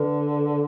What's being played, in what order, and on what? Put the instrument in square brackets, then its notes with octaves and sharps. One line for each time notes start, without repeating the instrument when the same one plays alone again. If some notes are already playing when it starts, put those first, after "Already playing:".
Already playing: [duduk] D3 [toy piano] B4